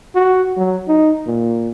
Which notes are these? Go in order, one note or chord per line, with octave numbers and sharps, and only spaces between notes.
F#4
F#3
D#4
A#2